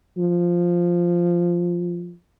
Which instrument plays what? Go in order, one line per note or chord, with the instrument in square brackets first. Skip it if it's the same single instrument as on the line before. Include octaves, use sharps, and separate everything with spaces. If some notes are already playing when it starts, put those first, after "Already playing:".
[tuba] F3